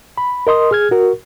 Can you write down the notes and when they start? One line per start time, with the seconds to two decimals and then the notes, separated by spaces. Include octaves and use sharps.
0.18 B5
0.47 A#4 D#5 C6 D#6
0.71 G#4 F6 G#6
0.91 F#4 A#4